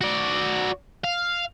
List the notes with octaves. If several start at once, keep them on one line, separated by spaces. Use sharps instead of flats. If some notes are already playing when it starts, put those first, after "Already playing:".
F#4 D5
F5